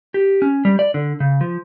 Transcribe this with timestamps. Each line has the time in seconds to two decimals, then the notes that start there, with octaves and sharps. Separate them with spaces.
0.14 G4
0.42 C#4
0.65 G3
0.79 D5
0.94 D3
1.20 C#3
1.41 F3